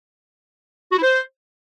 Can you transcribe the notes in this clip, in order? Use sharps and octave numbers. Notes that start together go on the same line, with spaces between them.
F#4
E4
C5